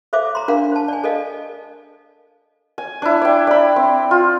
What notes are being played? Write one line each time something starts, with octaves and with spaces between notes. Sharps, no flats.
A4 C5 C#5 E5 F5 D6
A#5 C6
D4 A#4 F5 F#5
C5 A5
D5 G#5
A4 A#4 D5 D#5 F5
G#5
D4 E4
D5 G5
D5 B5
C4
F4